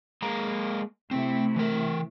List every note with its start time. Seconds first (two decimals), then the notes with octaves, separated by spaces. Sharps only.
0.22 G#3 A#3 A#5
1.11 C3 A3 C4 E4
1.56 E3 A#4